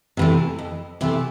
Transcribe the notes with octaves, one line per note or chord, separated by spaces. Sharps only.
C3 E3 A3
F2
C3 E3 A3